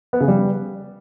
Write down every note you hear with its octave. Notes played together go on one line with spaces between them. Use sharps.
B3
C#3
G3